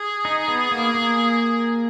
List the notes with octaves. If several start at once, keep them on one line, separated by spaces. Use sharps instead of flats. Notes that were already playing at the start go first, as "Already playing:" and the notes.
Already playing: G#4
D#4
B3
A#3
A#3